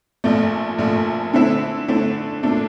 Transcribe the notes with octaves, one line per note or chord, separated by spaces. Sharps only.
A#1 A#2 A3
A#1 A#2 A3
D3 A3 C4 E4
D3 A3 C4 E4
A#2 A3 D4